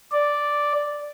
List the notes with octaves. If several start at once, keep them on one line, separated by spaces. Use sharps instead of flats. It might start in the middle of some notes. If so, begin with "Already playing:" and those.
D5